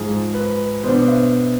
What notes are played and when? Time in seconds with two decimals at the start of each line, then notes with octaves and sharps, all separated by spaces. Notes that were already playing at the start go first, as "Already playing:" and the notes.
Already playing: G#2 F3 G#3 G#4
0.34 B4
0.83 B2 B3 D4 C5
1.08 E5